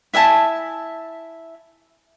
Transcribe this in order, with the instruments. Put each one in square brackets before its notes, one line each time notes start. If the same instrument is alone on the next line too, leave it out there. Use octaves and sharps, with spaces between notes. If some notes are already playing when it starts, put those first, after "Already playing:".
[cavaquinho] E4 E5 G#5 A5